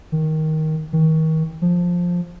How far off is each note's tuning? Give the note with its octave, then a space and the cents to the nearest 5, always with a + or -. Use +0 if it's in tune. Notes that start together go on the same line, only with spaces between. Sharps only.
D#3 +10
D#3 +35
F3 +10